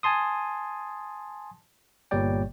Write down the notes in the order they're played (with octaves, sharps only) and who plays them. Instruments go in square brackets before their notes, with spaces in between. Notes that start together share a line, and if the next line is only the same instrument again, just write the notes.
[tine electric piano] G#5 A5 C6 D#6
G1 A#2 G3 C#5 D5 G5